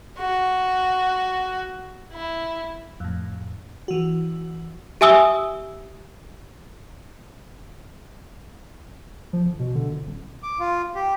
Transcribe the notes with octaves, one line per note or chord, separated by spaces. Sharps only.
F#4
E4
F2 A2
E3 F#4
G4 E5 G#5 D#6 E6 G7
F3
G1
B2
D3
G1
D#1
D6
F4
G4